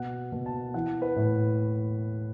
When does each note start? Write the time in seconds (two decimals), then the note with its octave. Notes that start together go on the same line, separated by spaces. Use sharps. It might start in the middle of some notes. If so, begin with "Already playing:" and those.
Already playing: B2 F#5
0.32 B2
0.46 A5
0.74 E3 F#5
1.02 B4
1.16 A2